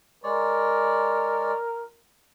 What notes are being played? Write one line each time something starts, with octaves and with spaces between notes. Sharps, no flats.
G#3 A#4 C#5 D5